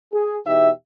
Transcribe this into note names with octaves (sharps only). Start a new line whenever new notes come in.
G#4
E2 B2 D#4 G4 E5